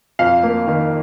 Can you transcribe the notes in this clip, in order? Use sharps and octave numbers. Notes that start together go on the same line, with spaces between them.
F2 F5
A#3
D#3